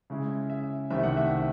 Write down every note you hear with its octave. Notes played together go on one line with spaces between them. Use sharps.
C#3 G#3 C#4 E4
E5
C2 C3 D#3 A3 E5
F#5
E5
E5